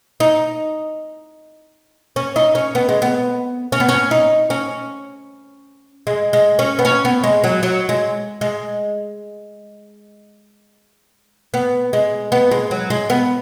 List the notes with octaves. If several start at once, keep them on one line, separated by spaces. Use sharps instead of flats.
D#4
C#4
D#4
C#4
B3
G#3
B3
C#4
B3
C#4
D#4
C#4
G#3
G#3
C#4
B3
C#4
B3
G#3
F#3
F#3
G#3
G#3
B3
G#3
B3
G#3
F#3
G#3
B3